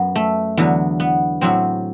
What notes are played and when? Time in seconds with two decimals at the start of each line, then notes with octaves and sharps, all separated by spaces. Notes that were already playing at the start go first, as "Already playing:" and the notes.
Already playing: F#2 F#3 B3
0.15 A3
0.57 E2 D3 F#3 B3
1.00 B3
1.41 A2 F#3 C4